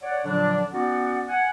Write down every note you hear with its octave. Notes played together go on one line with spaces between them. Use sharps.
C#5 D5 F#5
A#2 D3 F3 F#3 D4
B3 C#4 D#4 F#4 D5 F#5
F#5 G#5